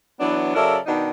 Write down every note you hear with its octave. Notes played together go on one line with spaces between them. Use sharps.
E3 F#3 B3 D4
C#3 F#3 A4 A#4 D5 E5
B2 D#3 D4 D#4